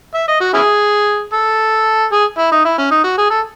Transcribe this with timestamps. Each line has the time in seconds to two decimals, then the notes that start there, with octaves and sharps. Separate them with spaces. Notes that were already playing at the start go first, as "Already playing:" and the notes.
0.14 E5
0.28 D#5
0.41 F#4
0.54 C#4 E4 G#4
1.33 A4
2.12 G#4
2.38 E4
2.52 D#4
2.65 E4
2.78 C#4
2.91 D#4
3.04 F#4
3.18 G#4
3.30 A4